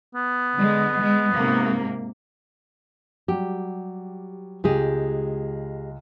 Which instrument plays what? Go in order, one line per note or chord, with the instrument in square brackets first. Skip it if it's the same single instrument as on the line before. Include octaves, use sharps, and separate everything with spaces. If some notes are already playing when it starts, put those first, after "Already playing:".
[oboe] B3
[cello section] D3 G#3
G#3
G#2 C3 A#3
[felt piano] F#3 G3 [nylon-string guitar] G4
[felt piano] C#2 [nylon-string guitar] G#3 G4 G#4